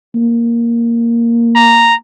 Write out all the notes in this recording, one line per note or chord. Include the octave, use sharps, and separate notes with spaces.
A#3
A#5